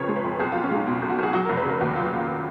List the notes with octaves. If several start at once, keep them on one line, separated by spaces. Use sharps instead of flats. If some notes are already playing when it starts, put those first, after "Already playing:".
Already playing: F2 C#3 F3 A#4 B4 C#5
G#3
B4
F2
B1 G#4
F4
B1
C#4
G#3 D#4
B2 F4
B1
F#4
B1 G#4
F#3 F#4
A#4
F1
B4
C#3 A#4
D#2 F#4
F#3 F4